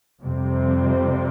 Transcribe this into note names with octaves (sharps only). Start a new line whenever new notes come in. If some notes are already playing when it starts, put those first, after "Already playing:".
F2 C3 G3 C4